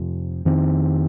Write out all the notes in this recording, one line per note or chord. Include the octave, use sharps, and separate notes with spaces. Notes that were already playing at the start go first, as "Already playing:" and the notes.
Already playing: F2 C3 F3
F2 D#3 C4